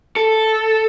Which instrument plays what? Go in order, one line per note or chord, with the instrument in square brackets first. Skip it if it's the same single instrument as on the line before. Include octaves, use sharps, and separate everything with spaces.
[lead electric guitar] A4